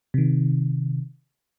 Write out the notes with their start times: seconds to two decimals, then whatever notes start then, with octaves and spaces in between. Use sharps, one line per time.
0.14 C3 D#3